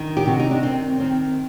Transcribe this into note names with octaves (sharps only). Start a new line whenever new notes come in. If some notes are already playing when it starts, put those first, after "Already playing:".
Already playing: D#3 D4
G4
C3 F#4
D#4
D4
D#3 C4
D#3 C4